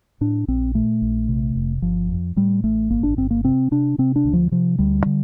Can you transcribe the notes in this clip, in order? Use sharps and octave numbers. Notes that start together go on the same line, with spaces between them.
A2 D4
A#1 C4
A#2 A3
A#1
C3
F1
G1 F3
F2
A2 G3
A1 A3
G1 A#3
D4
G1 C4
A#3
C3 C4
C3 D4
C3 C4
D4
D2
F3
C3 F3
D2 G3
D3